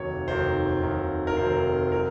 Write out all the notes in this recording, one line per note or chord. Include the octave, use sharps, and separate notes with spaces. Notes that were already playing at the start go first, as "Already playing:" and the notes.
Already playing: F1 D#2 D#3 F#3 C#5
F1 D#2 D#3 F#3 C5
F1 D#2 D#3 F#3
A#4
F1 D#2 D#3 F#3 C5
F#3 A#4